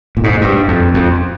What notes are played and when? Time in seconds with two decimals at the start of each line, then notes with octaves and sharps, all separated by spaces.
0.17 A#2
0.24 G#2
0.41 G2
0.68 F2
0.94 F2